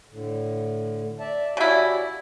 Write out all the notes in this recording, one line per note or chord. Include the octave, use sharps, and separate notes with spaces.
A2 D3
D5 E5 A5
C#3 E4 F#4 G4 D5